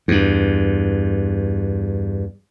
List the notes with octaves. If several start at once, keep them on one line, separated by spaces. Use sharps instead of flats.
E2 G2